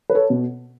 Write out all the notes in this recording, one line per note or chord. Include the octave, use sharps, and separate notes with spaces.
B4
A4 C#5
B2